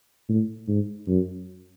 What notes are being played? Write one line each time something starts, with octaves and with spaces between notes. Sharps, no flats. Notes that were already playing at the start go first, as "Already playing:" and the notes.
A2
G#2
F#2